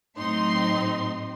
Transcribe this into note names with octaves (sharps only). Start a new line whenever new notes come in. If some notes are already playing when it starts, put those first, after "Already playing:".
A2 F#3 C4 D#4 C6